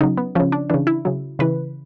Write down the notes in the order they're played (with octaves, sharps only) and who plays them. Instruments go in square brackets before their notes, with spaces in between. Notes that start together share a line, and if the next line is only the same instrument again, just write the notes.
[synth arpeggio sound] C#3 D#4
F#3
B3
C#3 F3 C#4
D4
C#3 E3 D4
E4
C#3 F#3
C#3 E3 B4